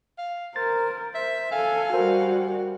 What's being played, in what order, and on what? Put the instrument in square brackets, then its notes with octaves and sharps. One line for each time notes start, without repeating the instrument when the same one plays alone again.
[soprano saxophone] F5
[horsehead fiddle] A#4 [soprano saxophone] C5 [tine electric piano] A6
[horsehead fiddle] C5 [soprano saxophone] E5
[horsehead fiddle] A4 G#5 [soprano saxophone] F5
[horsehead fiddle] G3 F#4 [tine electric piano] A#4 C5 G#5